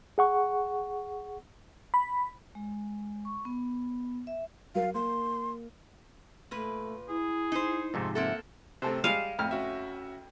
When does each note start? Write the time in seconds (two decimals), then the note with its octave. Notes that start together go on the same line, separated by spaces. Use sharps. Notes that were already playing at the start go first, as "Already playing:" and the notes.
0.18 G#4 F#5 C#6
1.94 B5
2.55 G#3
3.25 C#6
3.45 B3
4.27 E5
4.75 F#3 A#4 F5
4.94 A#3 C6
6.51 A#2 A3 B4
7.09 E4 G#4
7.52 D#4 C5
7.94 F2 G#2 C3 A3
8.15 A#3 C4 A4 E5 F#5
8.82 C3 A3 C4 A4 C5
9.04 G3 G#3 F5 D#7 E7
9.39 F2 A2 F6
9.51 C#4 F#4 E5